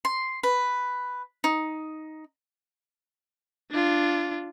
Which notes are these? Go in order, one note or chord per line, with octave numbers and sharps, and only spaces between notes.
C6
B4
D#4
D4 F4